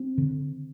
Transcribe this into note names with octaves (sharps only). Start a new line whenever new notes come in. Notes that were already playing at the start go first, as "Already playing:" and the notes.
Already playing: C4
D3